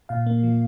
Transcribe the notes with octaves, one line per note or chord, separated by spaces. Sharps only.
A#2 F5
A#3
F3